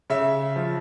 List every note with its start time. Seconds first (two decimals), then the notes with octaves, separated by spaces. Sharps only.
0.10 C#3 E5
0.56 F3